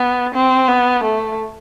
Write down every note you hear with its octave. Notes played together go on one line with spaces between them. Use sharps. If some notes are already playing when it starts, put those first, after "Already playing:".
Already playing: B3
C4
B3
A3